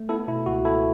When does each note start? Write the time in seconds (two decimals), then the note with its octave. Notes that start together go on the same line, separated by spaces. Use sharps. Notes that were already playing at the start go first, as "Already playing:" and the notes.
Already playing: A3
0.09 B3 E4 A4
0.28 B2 E4
0.46 C#2 F#4
0.65 B3 E4 A4